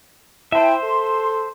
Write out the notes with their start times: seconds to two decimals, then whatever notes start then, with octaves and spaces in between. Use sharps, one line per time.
0.52 E4 C5 E5 G5 A5
0.84 A4 C6